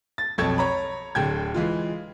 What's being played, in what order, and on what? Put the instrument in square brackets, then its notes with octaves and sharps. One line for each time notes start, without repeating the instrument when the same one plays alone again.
[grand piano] A6
B1 F2 A4 A5 C#6 G#6
C#5 A#5 B5
D1 D3 G5 G#6
E3 G#3 F4